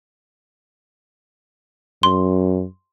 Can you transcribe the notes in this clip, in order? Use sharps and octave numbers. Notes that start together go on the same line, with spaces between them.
F#2 C6